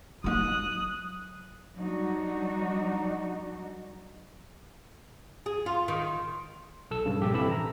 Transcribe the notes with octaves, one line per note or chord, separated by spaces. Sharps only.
F#3 D#4 D#6 F#6
F#3 G3 D4 D#4 F#4
G#4
F4
D#3
B1 A4 E6
G2 C#3
A#1 G4 E6
C3 E3 A4 B5 E6
A#5